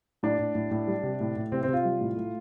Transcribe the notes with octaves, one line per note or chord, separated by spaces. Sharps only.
A2 D4
A2
A2
A2
G3
C3
A2
A2
C3 C4
C4
C3 F4
G3
A2
A3